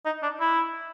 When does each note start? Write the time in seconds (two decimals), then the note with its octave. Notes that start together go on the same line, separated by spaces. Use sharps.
0.06 D#4
0.22 D4
0.40 E4